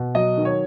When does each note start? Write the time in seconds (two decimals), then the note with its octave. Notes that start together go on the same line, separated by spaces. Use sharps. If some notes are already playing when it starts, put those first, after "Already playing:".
Already playing: B2
0.15 F#3 D#5
0.37 D#3
0.45 C#5